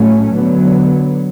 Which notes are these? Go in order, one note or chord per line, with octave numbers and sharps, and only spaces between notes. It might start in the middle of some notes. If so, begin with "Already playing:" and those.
Already playing: A2 F#3 A3 C#4
D3 F#3 B3